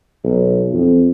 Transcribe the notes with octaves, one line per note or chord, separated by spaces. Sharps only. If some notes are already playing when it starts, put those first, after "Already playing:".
B1
F2